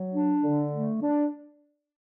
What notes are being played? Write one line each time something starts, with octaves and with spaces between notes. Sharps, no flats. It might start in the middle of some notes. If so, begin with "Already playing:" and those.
Already playing: F#3
D4
D3
A3
D4